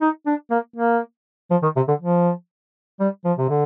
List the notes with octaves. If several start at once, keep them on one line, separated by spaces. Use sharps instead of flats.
D#4
D4
A#3
A#3
F3
D#3
C3
D3
F3
G3
F3
C3
D3